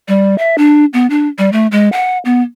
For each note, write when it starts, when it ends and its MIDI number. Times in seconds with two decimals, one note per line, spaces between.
0.08 0.37 55
0.38 0.56 76
0.58 0.85 62
0.93 1.09 59
1.10 1.28 62
1.38 1.50 55
1.52 1.67 57
1.71 1.89 56
1.92 2.18 78
2.25 2.42 59